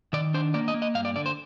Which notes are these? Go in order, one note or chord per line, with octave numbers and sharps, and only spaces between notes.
D#3 D5
D4 C5
A#3 D5
D#5
A#3
D#5
G2 F5
D5
D3 D5
C5